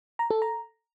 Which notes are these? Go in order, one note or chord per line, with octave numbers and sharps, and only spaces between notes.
A#5
A4
A#5